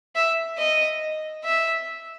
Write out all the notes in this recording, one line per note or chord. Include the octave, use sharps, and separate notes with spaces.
E5
D#5
E5